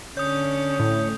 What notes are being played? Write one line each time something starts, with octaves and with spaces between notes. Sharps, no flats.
D3 C#4 C#5 D#6 G6
A2